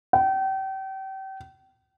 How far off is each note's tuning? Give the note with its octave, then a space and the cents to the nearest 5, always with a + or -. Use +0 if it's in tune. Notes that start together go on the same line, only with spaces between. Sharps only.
G5 -35